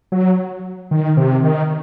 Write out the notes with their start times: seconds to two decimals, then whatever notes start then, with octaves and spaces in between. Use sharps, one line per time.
0.12 F#3
0.91 D#3
1.17 C3
1.43 D#3